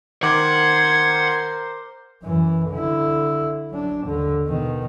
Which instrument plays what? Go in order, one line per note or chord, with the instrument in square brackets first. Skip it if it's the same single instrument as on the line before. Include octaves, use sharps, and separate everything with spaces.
[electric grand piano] D#3 D6 [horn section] A#4 C5 [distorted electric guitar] F#5 [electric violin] C6 G#6
[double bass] F#2 E3
D3 E4
F#3 D4
D#2 D3
B2 D#3